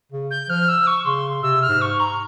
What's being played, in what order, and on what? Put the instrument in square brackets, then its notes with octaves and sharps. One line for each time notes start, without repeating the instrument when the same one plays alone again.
[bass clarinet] C#3
[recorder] G6
[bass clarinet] F3 [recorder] F6
[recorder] E6
C#6
[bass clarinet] C#3 [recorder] C6
[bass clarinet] C3 [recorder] E6
[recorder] F6
[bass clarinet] G#2
[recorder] C#6
A#5